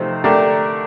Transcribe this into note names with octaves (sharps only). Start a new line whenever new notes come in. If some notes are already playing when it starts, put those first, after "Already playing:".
Already playing: C3 F3 A3 C4 D#4
D3 A3 D4 G4 A#4